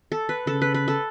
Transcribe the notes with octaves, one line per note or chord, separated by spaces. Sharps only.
A4
B4
C#3 A4
B4
B4
A4